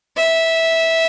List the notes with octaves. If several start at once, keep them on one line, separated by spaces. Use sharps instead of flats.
E5